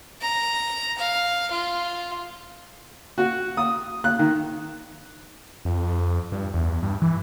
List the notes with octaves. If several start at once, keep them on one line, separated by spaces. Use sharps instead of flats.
A#5
F5
F4
F#4
D#6
F#6
D#3
F2
F2
G2
E2
G2
E3